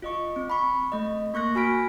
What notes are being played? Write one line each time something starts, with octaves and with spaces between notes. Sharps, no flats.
F4 D#5 C#6
C4
B5 C#6
A3 D#5
A#3 C#6 F#6 A#6
F#4 G#5 B5 F6 B6 D7